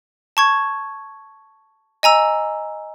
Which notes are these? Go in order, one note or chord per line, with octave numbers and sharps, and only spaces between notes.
A5 C#6 G#6
D#5 G#5 A#5 E6